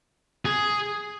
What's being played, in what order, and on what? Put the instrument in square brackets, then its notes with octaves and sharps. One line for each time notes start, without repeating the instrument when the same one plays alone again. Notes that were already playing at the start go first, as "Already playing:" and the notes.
[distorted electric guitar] G#4